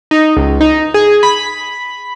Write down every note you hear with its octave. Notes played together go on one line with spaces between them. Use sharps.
D#4
C#2
D#4
G#4
B5